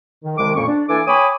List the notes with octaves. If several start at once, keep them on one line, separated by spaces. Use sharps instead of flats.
D#3
C2 D#3 G#3 D6
F2 A#2 A#3 C#4 C#6
D4
E3 A#3 D4 A4 G#5 D6
C#5 G5 G#5 B5 D6 D#6